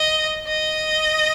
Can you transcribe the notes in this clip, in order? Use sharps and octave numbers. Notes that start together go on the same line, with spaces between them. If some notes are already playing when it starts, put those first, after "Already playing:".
Already playing: D#5
D#5